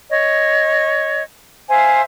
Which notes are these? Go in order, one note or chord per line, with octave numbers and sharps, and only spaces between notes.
C#5 D#5
C5 E5 F5 G#5